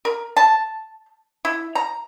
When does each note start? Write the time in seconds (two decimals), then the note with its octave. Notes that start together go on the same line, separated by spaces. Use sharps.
0.05 A#4
0.37 A5
1.45 E4
1.75 A#5